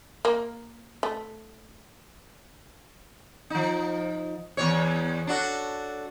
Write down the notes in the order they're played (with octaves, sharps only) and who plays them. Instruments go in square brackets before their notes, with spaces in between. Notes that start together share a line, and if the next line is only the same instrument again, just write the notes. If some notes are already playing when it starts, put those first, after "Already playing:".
[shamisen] A#3
A3
[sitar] F3 D#4
E2 C3 C#5
D4 F#4 A4